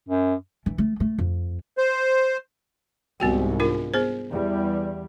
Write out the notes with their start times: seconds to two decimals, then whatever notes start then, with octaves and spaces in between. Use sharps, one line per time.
0.09 F#2
0.66 E3
0.78 A3
1.00 A3
1.18 F2
1.78 C5
3.20 C2 G#2 B3 F#4 G5
3.60 D4 F4 A#4
3.94 B3 G#4 C5
4.30 E2 G3